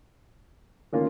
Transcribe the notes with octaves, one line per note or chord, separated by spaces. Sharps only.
D#3 A#3 C#4 F4